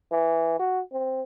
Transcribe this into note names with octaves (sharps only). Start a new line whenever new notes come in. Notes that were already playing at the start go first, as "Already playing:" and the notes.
E3
F#4
C4